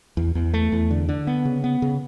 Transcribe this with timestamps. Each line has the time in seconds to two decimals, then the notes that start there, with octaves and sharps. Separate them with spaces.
0.17 E2
0.35 E2
0.54 A3
0.72 E2
0.90 D3
1.09 D3
1.27 B3
1.45 C#3
1.64 B3
1.82 C#3